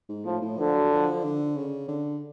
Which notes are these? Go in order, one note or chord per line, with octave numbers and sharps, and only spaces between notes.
G#2
A2 F3
A2
D3 F3
F#3
F3
D3
C#3
D3